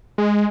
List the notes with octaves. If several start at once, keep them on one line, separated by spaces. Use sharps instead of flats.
G#3